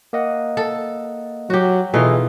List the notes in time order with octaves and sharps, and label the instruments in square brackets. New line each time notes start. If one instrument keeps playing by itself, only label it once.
[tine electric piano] A#3 D#5 F#5
[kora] A4
[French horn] F#3 [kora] F#4 G4
[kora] B2 D#4 F4 [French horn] E3 [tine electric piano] G#4 A4 E5